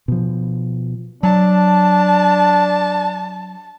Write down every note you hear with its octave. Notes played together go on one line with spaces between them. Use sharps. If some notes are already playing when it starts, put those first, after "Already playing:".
B2 F3
F#3 D4 A5